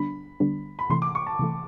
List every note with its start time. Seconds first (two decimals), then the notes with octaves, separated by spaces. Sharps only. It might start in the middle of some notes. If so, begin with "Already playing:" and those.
Already playing: D3 G3 B3 D4 B5
0.40 D3 G3 B3 D4
0.79 B5
0.89 C3 E3 A3 C6
1.02 D6
1.15 C#6
1.27 A5
1.39 C3 E3 A3